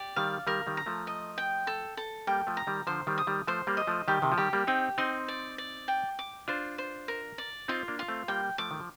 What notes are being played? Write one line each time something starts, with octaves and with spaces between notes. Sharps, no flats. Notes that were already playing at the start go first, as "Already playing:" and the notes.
Already playing: G4 D5
D#3 G3 F5
D#3 G3 A#4
D#3 G3
A#5
F3 A3
D#5
G5
A4
A4
G3 A#3 G5
F3 A3
A#5
D#3 G3
D3 F3 C5
D#3 G3
D#6
D#3 G3
F3 A3 C5
G3 A#3
D#5
F3 A3
D#3 G3 G4
C3 D#3
F3
D#3 G3 G4
G3 A#3
C4 D#4 G5
C4 D#4 C6
D5
D5
G5
D6
D4 F4 C5
C5
A#4
D5
C4 D#4 F4
A#3 D4
F4
A3 C4
G3 A#3 G5
F3 A3 D6
D#3
F3